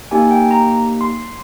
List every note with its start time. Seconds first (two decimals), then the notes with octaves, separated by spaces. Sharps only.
0.11 A#3 D#4 G4 G#5
0.31 G5
0.51 A#5
1.01 C6